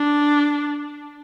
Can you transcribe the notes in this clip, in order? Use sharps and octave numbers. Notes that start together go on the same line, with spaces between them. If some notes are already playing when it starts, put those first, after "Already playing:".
Already playing: D4